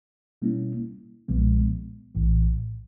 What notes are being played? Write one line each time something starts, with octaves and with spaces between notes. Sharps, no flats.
B2 G3 A#3 C#4 E4
B1 A#2 F3 G#3 B3
A#1 A2 E3